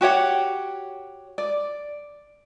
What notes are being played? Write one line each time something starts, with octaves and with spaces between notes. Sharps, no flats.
F#4 G4 C#5 F#5
D5